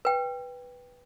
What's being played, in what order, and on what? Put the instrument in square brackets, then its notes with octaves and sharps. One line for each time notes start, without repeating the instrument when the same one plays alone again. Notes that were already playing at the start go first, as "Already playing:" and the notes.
[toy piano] B4 G5